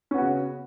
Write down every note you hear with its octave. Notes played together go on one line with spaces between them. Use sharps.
C#3 B3 C#4 F#4